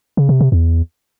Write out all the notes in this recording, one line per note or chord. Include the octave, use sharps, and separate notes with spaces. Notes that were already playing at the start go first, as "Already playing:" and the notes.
C#3
C3
C3
E2